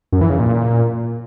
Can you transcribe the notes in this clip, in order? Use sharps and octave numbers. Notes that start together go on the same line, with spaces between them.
F#2
E3
C#3
A#2